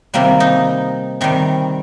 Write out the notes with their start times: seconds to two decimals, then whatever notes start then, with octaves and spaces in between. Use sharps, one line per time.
0.14 C3 D#3 G3 A#3
0.40 D#4
1.21 C3 D#3 G3